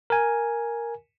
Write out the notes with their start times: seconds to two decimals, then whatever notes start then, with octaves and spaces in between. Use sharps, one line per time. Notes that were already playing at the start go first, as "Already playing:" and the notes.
0.10 A#4 G#5